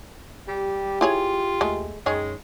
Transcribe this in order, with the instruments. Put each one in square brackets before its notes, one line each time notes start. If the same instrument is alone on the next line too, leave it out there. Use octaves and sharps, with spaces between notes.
[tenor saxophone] G3 [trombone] G4
[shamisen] E4 G#4 C#5 [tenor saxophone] F4
[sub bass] D#2 [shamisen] G#3 A3
[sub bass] F#2 [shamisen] D#3 G#4 C#5 [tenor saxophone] G#3